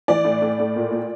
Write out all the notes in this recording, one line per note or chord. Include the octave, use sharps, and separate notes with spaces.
E3 D5
A2
A2
A2
A#2
A#2